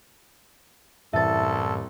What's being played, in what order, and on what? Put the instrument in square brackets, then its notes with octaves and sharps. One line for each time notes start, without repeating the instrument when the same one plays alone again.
[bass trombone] C2 [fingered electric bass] F#2 A2 E3 [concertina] A4 [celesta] E5 A6